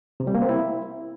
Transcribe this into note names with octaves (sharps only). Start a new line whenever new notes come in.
C3
G3
A#3
C4
E4